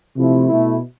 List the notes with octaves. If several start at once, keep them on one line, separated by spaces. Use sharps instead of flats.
C3 F3 A3 E4
B2 A3 E4